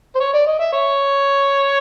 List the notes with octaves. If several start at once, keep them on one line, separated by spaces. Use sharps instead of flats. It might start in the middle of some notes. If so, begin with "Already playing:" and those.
C5
C#5
D5
D#5
E5
C#5